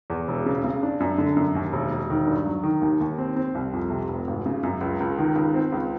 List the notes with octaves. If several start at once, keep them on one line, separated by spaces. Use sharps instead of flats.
E2
E1
C#3
C#3
D4
F#2
D3
F#2
D#2
E1
E1
D#3
G2
F#3
D#3
D#2
D#2
C4
C4
C2
F2
C3
F1
G#1
C#3
F#2
C#2
C#2
D#3
C#2
C4
C#2